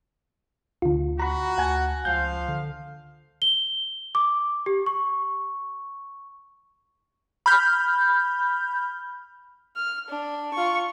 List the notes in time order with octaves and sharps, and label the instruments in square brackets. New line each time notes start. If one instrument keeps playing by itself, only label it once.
[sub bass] D2 [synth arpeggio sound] D3 F4
[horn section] F#4 [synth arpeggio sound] A#5 B5
[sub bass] D2 [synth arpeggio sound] F#5 G#5 A5
[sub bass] C#2 [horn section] F3 F5 [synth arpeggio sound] G6
[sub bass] D3
[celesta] G7
D6
G4
C#6
[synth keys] B5 F6 G6
[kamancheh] F6
D4
F4 C#6